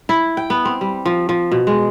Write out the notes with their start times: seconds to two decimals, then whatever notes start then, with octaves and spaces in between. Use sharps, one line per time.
0.09 E4
0.37 G5
0.50 B3
0.65 C4
0.81 G3
1.06 F3
1.29 F3
1.52 B2
1.67 G#3